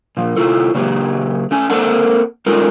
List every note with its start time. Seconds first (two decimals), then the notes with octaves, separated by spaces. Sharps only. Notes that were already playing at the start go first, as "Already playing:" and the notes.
0.17 A#2 F3
0.36 C3 E4 F4 A4
0.74 C#3 F#3 A#3 G4 G#4
1.51 A3 C#4 G#5
1.70 A#3 C4 A4 A#4 F#5 A5
2.46 G#3 C#4 D#4 F4 A4 A#4